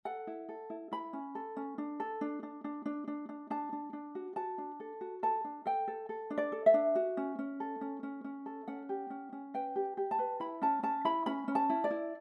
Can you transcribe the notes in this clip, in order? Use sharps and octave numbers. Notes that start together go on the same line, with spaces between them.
A4 F#5
E4
A4
E4
E4 B5
C#4
A4
C#4
D4
A4
D4
D4
D4
D4
D4
D4
D4 A5
D4
D4
F#4
F#4 A5
D4
A4
F#4
A4 A5
D4
A4 G5
A4
A4
D4
D5
A4
E5
D4
F#4
C#4
C#4
A4
C#4
C#4
C#4
A4
C#4 F#5
G4
C#4
C#4
B4 G5
G4
G4
A5
B4
E4 B5
C#4 A5
C#4 A5
E4 B5
C#4 B5
C#4
A5
E4
D5
E4